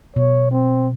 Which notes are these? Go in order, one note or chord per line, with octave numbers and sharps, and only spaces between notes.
B2 C#5
C4